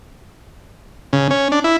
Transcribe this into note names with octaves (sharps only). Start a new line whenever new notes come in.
C#3
C#4
D4
E4